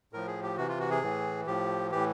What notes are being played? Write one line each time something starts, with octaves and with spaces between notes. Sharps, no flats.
A2 F3 A#4
G#4
G4
C3 E3 F#4
F4
F#4
G#4
A2 E3
A2 F3 G4
A2 E3 G4